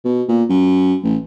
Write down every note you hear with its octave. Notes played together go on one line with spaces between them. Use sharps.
B2
A#2
F#2
A1